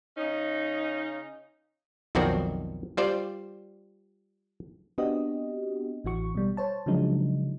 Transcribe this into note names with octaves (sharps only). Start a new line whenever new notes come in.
C#3 C#4 D#4
B1 F2 D#3 C4 F#4 D5
G3 F4 C5 D5
B3 C4 D4 F#4 G4 D#5
A1 E3 F#4 C#6
B2 G3
C5 C#5 A5
C#3 F3 F#3 G#3 D4 D#4